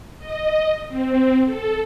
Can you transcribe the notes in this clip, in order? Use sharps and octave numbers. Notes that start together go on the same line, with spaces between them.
D#5
C4
A4